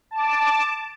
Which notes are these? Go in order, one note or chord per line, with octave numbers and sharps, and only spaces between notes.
A5 D6